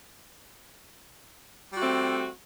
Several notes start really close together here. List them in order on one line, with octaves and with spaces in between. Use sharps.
G3 F#4 A3 C4